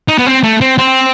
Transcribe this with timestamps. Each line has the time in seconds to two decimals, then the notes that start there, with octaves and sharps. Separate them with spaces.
0.08 D#4
0.18 B3
0.26 C4
0.43 A3
0.61 C4
0.78 C4